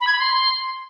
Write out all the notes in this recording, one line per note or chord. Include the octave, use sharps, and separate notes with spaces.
B5
G#6
B5
C6